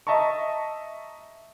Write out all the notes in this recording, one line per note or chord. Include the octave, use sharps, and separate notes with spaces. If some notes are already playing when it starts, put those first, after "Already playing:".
D#5 E5 A5 A#5 C#6